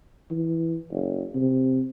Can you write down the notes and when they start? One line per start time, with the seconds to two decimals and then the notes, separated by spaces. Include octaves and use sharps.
0.31 E3
0.91 F#1
1.35 C3